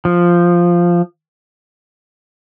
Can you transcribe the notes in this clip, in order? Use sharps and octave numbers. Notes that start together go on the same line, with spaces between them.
F3